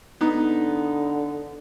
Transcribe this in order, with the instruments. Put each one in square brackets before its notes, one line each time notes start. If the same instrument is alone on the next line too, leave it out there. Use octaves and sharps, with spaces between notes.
[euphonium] D3 [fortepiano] B3 D#4